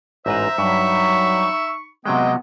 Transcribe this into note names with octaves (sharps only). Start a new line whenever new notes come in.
A1 G#2 B4 C5 E5 A#5
G2 F#3 D#4 B5 C#6
C3 F#3 G#3 B3 D#5 G5